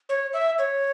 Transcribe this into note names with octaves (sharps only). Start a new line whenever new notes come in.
C#5
E5
C#5